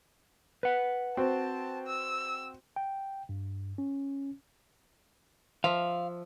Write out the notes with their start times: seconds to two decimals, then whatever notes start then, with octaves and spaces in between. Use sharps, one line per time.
0.63 B4 F#5
1.17 C4 F#4 A5
1.87 E6
2.76 G5
3.29 G2
3.78 C#4
5.64 F3 E5 F5